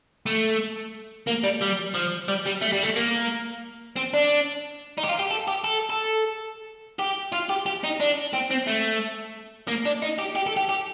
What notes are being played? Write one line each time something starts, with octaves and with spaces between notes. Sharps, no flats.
A3
A#3
G3
G3
F3
G3
G3
A3
G3
A3
A#3
C4
D4
D#4
G4
F4
G4
A4
G4
A4
A4
G4
F4
G4
G4
D#4
D4
C4
C4
A3
A#3
D4
D#4
G4
G4
A4
G4
G4